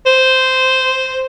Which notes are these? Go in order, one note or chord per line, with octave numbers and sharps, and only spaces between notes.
C5